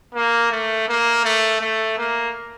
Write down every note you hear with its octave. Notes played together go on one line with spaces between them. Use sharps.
A#3
A3
A#3
A3
A3
A#3